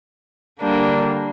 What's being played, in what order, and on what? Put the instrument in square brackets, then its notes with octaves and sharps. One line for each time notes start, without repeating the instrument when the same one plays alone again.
[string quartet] D3 G3 A#3 D4